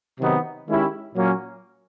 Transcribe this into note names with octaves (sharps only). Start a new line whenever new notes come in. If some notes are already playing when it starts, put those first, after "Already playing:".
C3 D#3 F#3 B3 D#4
D#3 G#3 C#4 E4 G4
A#2 F#3 A#3 C#4